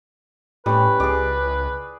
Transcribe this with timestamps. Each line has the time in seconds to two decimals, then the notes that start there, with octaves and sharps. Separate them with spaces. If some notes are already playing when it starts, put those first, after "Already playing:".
0.66 A2 G3 C#4 B4
1.00 C#2 G#4 D5